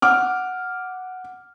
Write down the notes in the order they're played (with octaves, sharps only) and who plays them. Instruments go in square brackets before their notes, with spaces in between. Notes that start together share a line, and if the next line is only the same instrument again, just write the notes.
[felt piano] F#5 D6 F6